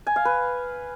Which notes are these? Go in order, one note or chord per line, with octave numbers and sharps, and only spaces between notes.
G#5
F5
B4